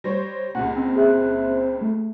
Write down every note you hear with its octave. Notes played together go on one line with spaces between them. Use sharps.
G3 C5 C#5 A#6
C#2 A#2 F#5
C4
G#4 E5 F#6
A3